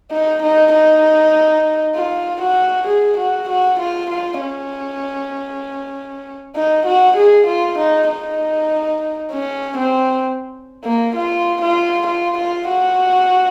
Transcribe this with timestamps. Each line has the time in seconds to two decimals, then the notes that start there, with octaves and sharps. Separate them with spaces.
0.12 D#4
0.43 D#4
0.73 D#4
1.95 F4
2.42 F#4
2.87 G#4
3.18 F#4
3.49 F#4
3.80 F4
4.11 F4
4.41 C#4
6.56 D#4
6.86 F#4
7.17 G#4
7.47 F4
7.78 D#4
8.09 D#4
9.32 C#4
9.78 C4
10.85 A#3
11.16 F4
11.62 F4
12.07 F4
12.38 F4
12.69 F#4